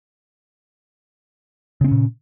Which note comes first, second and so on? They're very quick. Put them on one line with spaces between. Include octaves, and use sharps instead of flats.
C#3 C4 C#4 A#2